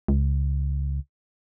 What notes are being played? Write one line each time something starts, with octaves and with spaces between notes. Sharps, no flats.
C#2